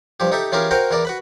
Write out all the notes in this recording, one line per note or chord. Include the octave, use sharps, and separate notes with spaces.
G2 F3 G4
D#4 G4 A4 E5
E3 C#4 F4 G4 G#4 A#4
F#4 A#4 C5 F5 G5 A#5
E2 E3 A#4 D5
F#4 B4 B5